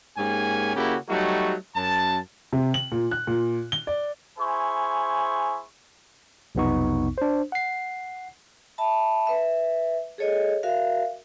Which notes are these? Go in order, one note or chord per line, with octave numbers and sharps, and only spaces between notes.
G#2 A#3 C#4 G4 G#5
C#3 A#3 E4 F#4 G4
F#3 G3 A3 D#4 F#4
F#2 A5
C3
F#7
A#2
F#6
A#2
G7
D5
E4 G#4 C5 G#5 C#6
B1 F2 C3 B3 D#4 C#6
D4 C5
F#5 C7
E5 A5 B5
B4 E5
G#4 A4 C#5 D#5
F#4 A#4 E5 F5